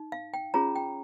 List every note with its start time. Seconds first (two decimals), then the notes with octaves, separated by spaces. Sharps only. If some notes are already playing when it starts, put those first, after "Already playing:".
Already playing: D#4
0.12 F5
0.34 G5
0.54 C#4 F4 G#4 C#5 A#5
0.76 G5